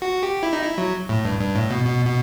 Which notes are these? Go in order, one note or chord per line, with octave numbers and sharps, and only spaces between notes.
F#4
G4
E4
D#4
E4
F#3
A2
G2
G2
A2
B2
B2
B2